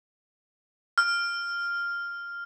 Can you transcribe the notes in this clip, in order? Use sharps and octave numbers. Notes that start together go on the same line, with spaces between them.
F6